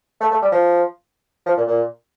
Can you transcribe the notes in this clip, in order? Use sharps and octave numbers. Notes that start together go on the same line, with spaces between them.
A3
A3
G3
F3
F3
A#2
A#2